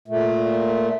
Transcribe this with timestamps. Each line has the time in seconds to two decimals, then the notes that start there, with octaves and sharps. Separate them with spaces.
0.08 A#2 A3